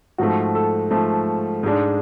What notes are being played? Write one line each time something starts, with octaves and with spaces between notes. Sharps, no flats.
G#2 F3 A3 F#4
A4
G#2 F3 A3
G#2 G#3 D4